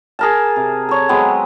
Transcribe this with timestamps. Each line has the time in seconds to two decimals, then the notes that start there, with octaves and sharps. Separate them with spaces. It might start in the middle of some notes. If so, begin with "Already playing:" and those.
0.19 G#4 A#4 A5
0.56 C3
0.89 A4 C#5
1.09 F#3 G#3 B3 C4